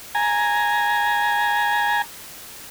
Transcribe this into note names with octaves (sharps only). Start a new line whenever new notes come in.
G#5 A#5